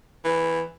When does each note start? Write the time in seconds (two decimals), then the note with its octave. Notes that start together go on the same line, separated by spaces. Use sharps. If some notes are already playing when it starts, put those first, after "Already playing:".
0.24 E3